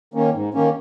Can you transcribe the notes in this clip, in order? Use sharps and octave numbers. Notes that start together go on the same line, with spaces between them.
D#3 A#3 C#4
G#2
D#3 A#3 C#4